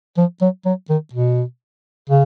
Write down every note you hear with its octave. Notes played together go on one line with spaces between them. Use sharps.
F3
F#3
F#3
D#3
B2
C#3